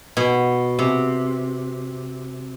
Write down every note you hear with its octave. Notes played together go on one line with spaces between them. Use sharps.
B2
C3